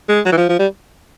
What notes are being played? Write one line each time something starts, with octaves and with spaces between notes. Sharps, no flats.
G#3
F#3
E3
F3
F3
G3